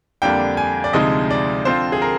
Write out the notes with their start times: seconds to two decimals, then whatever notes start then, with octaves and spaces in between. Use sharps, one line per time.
0.22 F2 D3 G3 A#3 D4 G5
0.57 G#5
0.84 D5
0.93 D2 C3 F3 G#3 D#4 D#5
1.31 D5
1.65 D3 F3 C4 F4 C5
1.92 G#4
2.02 A#4